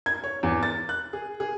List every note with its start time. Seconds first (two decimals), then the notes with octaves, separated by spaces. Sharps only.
0.06 G#6
0.24 C#5
0.43 E2
0.63 A6
0.89 F#6
1.13 G#4
1.40 G#4